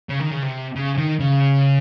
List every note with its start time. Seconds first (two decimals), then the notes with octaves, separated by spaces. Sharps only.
0.10 C#3
0.20 D#3
0.31 C#3
0.43 C3
0.76 C#3
0.98 D#3
1.20 C#3